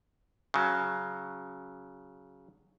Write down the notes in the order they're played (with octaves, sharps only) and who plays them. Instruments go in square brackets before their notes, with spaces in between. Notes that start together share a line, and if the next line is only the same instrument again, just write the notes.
[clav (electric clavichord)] C#3 F#3